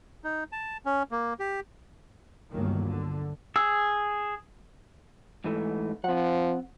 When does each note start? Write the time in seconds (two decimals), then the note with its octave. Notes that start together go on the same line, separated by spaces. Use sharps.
0.24 D#4
0.52 A5
0.85 C#4
1.11 A#3
1.39 G4
2.54 G1 C#2 D#3 F#3 A#3
2.87 D3
3.56 G#4 E6
5.44 G#2 E3 A3
6.04 F3 C4 F#5